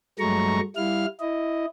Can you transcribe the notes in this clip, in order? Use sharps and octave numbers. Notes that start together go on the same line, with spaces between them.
G2 F#3 G#3 A3 A#5 C#6
G3 E4 F5 F6
E4 D#5